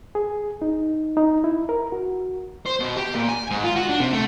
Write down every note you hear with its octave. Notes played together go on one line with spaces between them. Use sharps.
G#4
D#4
D#4
E4
A#4
F#4
C5
B2
G4
A#2
G#5
G#2
F4
F#4
D4
C3
A3